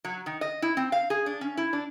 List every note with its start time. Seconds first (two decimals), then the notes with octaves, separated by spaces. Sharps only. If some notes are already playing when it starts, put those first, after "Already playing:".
0.04 F#3
0.26 D#3
0.41 D#5
0.62 E4
0.77 C4
0.92 F5
1.10 G#4
1.26 D4
1.41 C#4
1.57 E4
1.73 D4